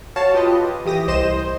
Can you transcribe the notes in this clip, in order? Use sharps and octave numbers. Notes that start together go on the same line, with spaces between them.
F#4 C#5 F5 A5
F4 G4 B4 D#5
E3 G4 D#6 A#6
C2 C5 D#5 C6 E7
C5